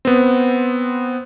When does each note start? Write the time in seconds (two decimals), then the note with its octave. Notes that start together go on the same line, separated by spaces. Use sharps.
0.05 B3 C4